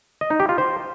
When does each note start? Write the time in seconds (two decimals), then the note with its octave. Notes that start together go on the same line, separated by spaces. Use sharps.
0.21 D#5
0.30 D#4
0.40 G4
0.49 F4
0.58 C5